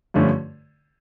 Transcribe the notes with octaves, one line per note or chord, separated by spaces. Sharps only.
G2 D3 F3 A3 C#4